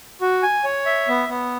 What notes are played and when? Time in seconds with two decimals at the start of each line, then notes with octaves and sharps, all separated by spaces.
0.21 F#4
0.43 G#5
0.64 C#5
0.86 E5
1.08 B3
1.29 B3